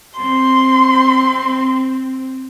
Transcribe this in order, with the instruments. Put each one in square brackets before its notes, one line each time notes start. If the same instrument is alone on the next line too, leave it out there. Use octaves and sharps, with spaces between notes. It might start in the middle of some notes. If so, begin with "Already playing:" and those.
[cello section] C4 [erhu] C6